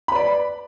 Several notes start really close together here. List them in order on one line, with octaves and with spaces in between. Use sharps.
B5 B4 D5